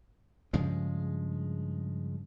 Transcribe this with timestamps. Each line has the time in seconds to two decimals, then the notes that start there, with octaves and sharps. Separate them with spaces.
0.53 G2 C#3 F3 G#3